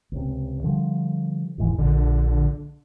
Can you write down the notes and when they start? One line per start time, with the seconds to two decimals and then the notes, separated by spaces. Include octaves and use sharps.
0.12 C#2 C3
0.64 D3 F3 G3
1.58 E1 G#2 E3
1.78 A#1 D3